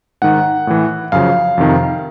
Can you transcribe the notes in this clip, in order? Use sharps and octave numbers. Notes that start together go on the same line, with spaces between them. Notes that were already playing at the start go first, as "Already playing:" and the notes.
G#2 D#3 F#5
A2 E3
F#2 C#3 F3 F5
F2 C3 D#3